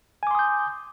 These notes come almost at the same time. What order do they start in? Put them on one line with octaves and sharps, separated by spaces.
G#5 D6 C6 D#6 G6